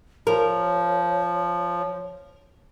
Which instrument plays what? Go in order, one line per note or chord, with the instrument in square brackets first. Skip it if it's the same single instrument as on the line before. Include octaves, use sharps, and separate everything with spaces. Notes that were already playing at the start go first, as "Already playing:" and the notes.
[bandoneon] F3 [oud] A#4 [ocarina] C#5